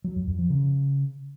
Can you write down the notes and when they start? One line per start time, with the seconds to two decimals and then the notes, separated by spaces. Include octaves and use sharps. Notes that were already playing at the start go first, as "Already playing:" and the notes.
0.04 F#3
0.16 F2
0.27 F2
0.39 F3
0.50 C#3